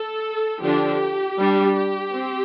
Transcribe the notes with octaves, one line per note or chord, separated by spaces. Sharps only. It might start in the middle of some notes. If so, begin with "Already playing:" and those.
Already playing: A4
D3 F3 D4 G4
G3 D4
G4
C4